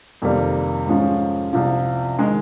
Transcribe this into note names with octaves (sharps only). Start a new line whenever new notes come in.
F2 C3 D#3 G3 A#3
G#2 F3 G#3 C#4
C2 C3 F3
D#3 G#3